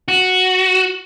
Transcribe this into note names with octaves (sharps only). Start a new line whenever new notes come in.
F#4